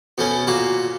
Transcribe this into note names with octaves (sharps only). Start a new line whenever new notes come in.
B2 A3 C#4
A#2 A#3 F#4